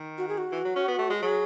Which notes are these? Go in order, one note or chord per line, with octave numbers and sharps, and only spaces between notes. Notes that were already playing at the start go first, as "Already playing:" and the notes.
Already playing: D#3
F#4
G#4
F#4
E3
F#3
C#4
B3
A3
G#3
F#3 G#4